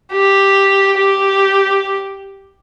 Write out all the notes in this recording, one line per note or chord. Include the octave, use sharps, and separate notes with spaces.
G4
G4